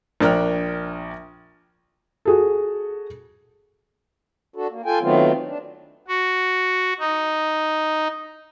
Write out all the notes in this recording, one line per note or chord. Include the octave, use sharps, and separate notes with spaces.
A#1 D4 A#4 G5 F6
F#4 G#4 A4
D4 F#4 A4
A#3
F4 A4 G5 G#5
D#3 F#3 A3 B3 C4 F4
D4
F#4
D#4